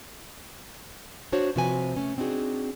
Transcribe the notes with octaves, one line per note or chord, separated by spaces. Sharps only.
D4 F#4 C5 C#5
C3 F3 F#4 B4 G#5
A3 C#4
C4 D4 D#4 F#4 G#4